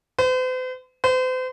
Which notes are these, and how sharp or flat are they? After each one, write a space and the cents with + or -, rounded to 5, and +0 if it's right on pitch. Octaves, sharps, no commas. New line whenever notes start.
C5 -45
C5 -40